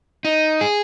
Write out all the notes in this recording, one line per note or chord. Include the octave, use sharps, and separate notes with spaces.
D#4
G#4